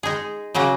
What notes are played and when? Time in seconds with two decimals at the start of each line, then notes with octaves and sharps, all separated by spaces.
0.03 G#3 D#4 G#4
0.54 C#3 F#3 A#3 C#4